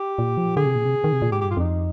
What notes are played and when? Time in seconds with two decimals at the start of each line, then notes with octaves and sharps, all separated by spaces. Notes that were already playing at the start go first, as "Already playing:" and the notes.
Already playing: G4
0.19 A#2
0.37 F3
0.57 D3 G#4
0.65 C3
0.75 A#2
0.85 C3
1.04 D#3
1.13 C3
1.22 A#2
1.31 G#2 G4
1.41 G2 G4
1.51 F4
1.57 F2 D#4